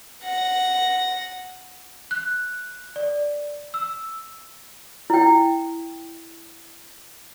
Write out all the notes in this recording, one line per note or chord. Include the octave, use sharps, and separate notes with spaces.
F#5 A#6
F#6
D5
E6
E4 G5